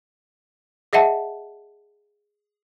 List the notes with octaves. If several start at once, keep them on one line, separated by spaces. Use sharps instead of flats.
G#4 D#5 E5 F#5 A5